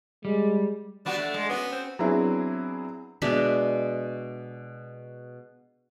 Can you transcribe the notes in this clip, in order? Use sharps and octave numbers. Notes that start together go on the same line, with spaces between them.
G3 G#3
G3 B3 D4 F#4
A3
G#3
B3 C#4 F#4
C4
F#3 B3 C4 D4 E4 G#4
B2 G#3 D4 E5